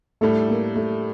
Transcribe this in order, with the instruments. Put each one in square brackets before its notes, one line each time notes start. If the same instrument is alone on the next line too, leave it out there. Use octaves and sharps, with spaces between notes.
[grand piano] A2 G3 D4 A4 [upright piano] A3
[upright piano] A#3
A3